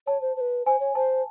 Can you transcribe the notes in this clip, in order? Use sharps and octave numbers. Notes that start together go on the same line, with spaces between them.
C#5 A5
C5
C5
B4
C5 G#5
C#5
C5 A5